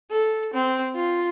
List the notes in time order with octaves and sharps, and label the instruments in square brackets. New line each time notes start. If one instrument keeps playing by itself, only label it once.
[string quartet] A4
C4
F4